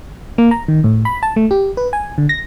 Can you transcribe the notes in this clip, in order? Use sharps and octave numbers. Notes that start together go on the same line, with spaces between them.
A#3
A#5
D#3
A2
B5
A5
A3
G4
B4
G#5
D3
A#6